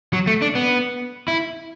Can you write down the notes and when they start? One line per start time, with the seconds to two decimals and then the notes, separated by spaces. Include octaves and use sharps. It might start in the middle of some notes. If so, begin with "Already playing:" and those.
0.13 F#3
0.27 A3
0.42 D4
0.55 B3
1.28 E4